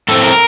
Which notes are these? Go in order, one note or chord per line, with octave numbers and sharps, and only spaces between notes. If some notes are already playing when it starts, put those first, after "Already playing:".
A2 A3 C4 A4
A#4